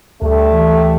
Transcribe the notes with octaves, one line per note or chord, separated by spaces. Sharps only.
D2 G3 A3
E3